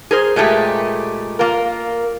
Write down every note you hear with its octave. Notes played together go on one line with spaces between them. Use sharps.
G#4 A#4 C5
A#2 G#3 A3 D4 G4
A#3 F4 A#4